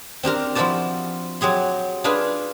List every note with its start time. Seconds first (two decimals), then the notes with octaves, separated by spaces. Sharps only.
0.23 C4 D4 G4 A#4
0.55 F3 E4 F#4 C5 D5 A5
1.41 F#3 G4 G#4 C6
2.04 D4 F4 G#4 B4